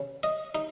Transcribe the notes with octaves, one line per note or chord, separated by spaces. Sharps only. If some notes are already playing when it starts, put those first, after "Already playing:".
Already playing: C#3
D#5
D#4